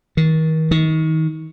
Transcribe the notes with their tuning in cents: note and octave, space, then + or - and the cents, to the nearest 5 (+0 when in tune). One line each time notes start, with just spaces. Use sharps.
D#3 +35
D#3 +30